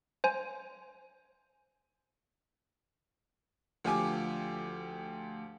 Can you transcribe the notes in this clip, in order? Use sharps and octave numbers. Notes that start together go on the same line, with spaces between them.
C5 G#5
D2 F3 G4 G#5 D6